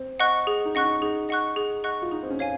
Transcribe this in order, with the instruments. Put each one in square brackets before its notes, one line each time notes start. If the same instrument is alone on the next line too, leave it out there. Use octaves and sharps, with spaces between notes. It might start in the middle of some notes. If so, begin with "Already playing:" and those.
Already playing: [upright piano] C4
[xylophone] D#5 F#5 C#6 F#6
G#4
[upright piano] D#4
[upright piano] C#4 [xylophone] D#5 F#5 C#6 F#6
[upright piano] D#4
[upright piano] D#4 [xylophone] G#4
[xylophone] D#5 F#5 C#6 F#6
G#4
D#5 F#5 C#6 F#6
[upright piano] F4
[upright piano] D#4 [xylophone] G#4
[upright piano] C4
C#4
[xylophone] C#5 F5 G#5